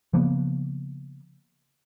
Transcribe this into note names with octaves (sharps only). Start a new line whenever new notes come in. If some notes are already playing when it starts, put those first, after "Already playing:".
C#3 F3 A#3 B3